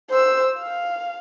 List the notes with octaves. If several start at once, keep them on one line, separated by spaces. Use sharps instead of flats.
C5 E6
F5